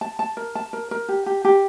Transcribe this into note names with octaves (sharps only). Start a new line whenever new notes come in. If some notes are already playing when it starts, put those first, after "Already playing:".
A5
A5
A#4
A5
A#4
A#4
G4
G4
G4